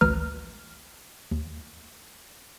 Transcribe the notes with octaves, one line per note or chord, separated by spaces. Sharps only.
A1 D2 B4 A#5 F6
D#2